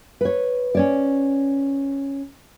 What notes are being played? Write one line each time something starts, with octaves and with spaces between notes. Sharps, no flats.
B4 C#5
C#4 C#5 D5